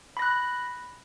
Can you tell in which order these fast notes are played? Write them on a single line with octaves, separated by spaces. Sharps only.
B5 A#6 F#6